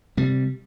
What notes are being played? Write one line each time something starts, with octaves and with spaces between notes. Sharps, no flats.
C3 G3